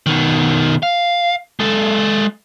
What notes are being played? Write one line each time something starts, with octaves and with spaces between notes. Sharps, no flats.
B2 D#3
F5
G#3 A4